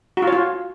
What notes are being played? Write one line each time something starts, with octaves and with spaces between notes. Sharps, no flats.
F#4
F4
C#5
F4